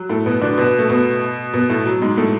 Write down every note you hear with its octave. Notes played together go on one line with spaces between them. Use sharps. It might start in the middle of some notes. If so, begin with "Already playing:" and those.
Already playing: F#3
A2 A3
B2 B3
D3 D4
B2 B3
A3
B2 B3
B2 B3
A2 A3
F#3
G#2 G#3
A2 A3